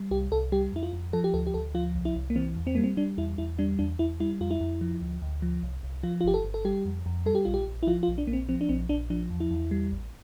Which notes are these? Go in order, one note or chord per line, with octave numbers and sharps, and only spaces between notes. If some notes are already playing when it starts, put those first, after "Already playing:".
Already playing: G3
C2 G4
C2 A4
G3 G4
F2 E4
F4
F2
F3 A4
G4
D2 A4
G4
D2 A4
F3 F4
C2
E4
C2
A#3
E3 C4
E2
C4
G3 A#3
C4
G3 D4
E2 E4
E2 E4
G3 D4
E2 D4
E2 E4
G3 E4
F2 F4
E4
F2
F3
D2
D2
F3
C2
C2
F3 F4
F4
G1 G4
A4
G1
A4
G3 G4
F2
F2
G3 A4
G4
A#1 F4
G4
A#1
E4
F3 F4
F4
A#1
D4
A#1 A#3
C4
F3 C4
D4
A#1 C4
A#1 D4
F3 D4
E2
E4
E2
G3
A1